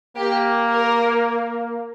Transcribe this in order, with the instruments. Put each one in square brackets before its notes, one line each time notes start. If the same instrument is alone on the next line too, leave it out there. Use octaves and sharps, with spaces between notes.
[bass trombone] A#3 [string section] G4
[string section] A#4